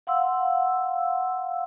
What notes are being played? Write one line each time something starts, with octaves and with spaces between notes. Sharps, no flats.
F5 F#5 C6 E6